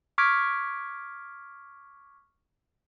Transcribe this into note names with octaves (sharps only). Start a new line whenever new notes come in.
C#6 D6 F6 G#6 B6 D7